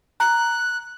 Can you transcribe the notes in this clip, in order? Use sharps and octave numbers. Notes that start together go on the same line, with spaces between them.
A#5 F#6